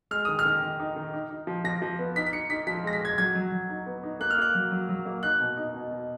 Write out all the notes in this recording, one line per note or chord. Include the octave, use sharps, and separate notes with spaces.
G#3 F6
D#3 D#6
F6
D#3
D#3
D#4
D#3
D#4
D#4
F3
F3 A#6
F3
B3
D#4 B6
B6
D#4 C#7
D#4 B6
F3 B6
G#3 A#6
B6
G#3 G#6
F#3 G#6
F#3
F#3
D#4
B3
D#4
A#3 F#6
F6
A#3 F#6
F#3
F#3
F#3
A#3
D#4 F#6
B2
D#4
B2
B2